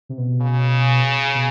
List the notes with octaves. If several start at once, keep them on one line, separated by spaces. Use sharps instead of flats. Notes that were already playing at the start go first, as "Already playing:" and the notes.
C3
B2
C#3
B2